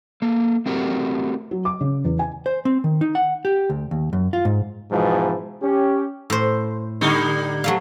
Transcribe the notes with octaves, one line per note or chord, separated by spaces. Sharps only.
A#3 A4
A3 C4 F#4 G4 A#4
F#3
D6
C#3
E2
G#5
C5
C4
D#3
D#4
F#5
G4
D2
D#2
F#2
F4
G#2
G#2 B2 E3 F3 G#3 B3
C#4 G4
A2 C5
D3 G3 D#4
F#3 A3 F5